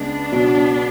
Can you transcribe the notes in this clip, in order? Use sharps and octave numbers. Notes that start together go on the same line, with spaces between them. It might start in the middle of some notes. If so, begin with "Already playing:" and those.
Already playing: C#2 B3 D4
B2 F#3